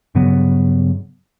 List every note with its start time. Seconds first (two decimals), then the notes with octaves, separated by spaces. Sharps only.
0.15 G2 C#3 F#3 B3